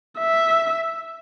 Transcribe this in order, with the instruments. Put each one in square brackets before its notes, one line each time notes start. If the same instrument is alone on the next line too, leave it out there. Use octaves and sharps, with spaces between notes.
[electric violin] E5